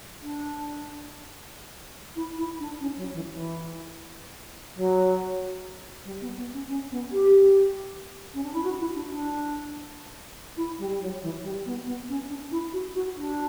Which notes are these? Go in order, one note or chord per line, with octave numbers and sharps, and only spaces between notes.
D4
E4
E4
D4
C#4
F#3
E3
E3
F#3
G3
B3
B3
C#4
C#4
B3
G4
C#4
D4
E4
F#4
E4
D4
D4
E4
G3
F#3
E3
G3
B3
B3
C#4
D4
E4
F#4
F#4
D4